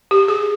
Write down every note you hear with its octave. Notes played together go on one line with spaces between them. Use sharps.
G4
G#4